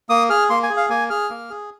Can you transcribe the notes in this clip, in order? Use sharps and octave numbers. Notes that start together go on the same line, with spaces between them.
A#3 D#6
G#4 F6
A#3 C6
G#5
G#4
F5
A#3 G#5
G#4 F6
A#3
G#4